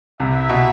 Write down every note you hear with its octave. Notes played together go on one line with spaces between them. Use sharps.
C2 C3 E4 B4 E5
B2